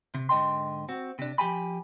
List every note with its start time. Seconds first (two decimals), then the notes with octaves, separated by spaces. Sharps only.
0.15 C3
0.29 G#2 D3 D#5 G5 C6
0.89 C4 F#4
1.19 C3 D4
1.38 F3 G4 G5 G#5 B5